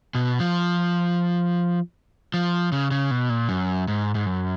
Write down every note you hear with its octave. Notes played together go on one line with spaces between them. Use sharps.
B2
F3
F3
C#3
C#3
B2
A#2
F#2
G#2
G#2
F#2